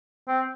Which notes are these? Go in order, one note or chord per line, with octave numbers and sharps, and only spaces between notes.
C4